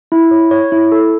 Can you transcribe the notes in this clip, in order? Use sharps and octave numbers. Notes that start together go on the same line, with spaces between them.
E4
C#5
C#5
E4
A4